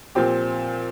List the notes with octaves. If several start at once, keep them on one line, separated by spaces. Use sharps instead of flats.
A#2 F3 C4 G4